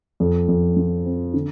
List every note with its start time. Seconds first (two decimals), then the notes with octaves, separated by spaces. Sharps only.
0.20 F2
0.48 F2
0.77 F3
1.06 C4
1.34 D3